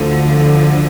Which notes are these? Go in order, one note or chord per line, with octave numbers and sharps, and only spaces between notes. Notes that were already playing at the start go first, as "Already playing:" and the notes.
Already playing: D2 D3 F3